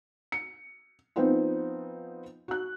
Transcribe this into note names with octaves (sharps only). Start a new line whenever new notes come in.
C#7
F3 B3 C4 D#4 F4
F#4 F#6